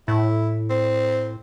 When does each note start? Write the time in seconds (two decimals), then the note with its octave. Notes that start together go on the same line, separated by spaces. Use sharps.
0.08 A2 E4
0.70 C4